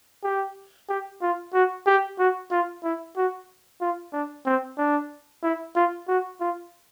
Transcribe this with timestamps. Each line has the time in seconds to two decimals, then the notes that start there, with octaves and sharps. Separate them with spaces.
0.24 G4
0.89 G4
1.22 F4
1.54 F#4
1.87 G4
2.19 F#4
2.51 F4
2.84 E4
3.17 F#4
3.81 F4
4.13 D4
4.46 C4
4.78 D4
5.43 E4
5.76 F4
6.08 F#4
6.41 F4